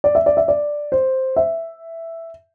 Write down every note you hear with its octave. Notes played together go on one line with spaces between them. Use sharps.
D5
E5
D5
E5
D5
C5
E5